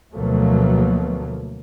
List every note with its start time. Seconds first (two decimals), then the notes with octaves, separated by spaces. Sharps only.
0.14 D2 B2 F3 F#3 A3 A#3